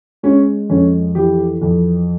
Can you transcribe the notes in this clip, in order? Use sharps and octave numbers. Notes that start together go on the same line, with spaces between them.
G#3 C#4
F2 C#4
E3 G4
F2